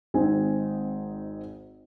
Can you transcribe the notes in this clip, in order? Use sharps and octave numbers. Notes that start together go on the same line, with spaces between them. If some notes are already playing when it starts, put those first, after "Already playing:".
G#1 G#2 C4 D#4 G#5